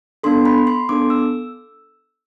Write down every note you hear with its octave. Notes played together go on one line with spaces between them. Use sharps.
B3 D4 A4 C6
B5
C6
B3 D4 A4 D6
E6